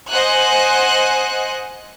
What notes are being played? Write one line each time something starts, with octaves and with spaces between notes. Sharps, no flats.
C5 D#5 F#5 G#5 F#6